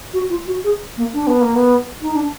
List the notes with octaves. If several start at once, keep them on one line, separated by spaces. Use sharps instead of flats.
F#4
F4
F#4
G#4
A#3
D4
B3
A#3
B3
D#4
D4